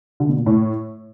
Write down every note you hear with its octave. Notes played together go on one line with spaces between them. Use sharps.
D3
B2
A#2
A2